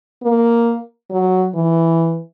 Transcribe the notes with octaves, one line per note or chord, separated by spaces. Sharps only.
A#3
F#3
E3